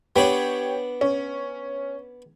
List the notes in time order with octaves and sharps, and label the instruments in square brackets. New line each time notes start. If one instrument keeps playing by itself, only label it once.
[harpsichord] B3 D4 B4 [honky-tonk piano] G4 C#5
[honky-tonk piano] C#4